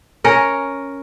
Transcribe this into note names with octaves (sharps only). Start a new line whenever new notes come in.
C#4 A#4 C#5